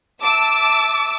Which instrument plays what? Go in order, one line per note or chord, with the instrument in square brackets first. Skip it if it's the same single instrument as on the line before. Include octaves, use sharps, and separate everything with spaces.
[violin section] E5 A5 D6 E6